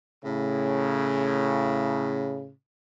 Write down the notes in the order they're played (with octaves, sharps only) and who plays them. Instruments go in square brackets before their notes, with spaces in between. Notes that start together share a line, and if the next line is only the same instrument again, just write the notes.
[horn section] A2 C#3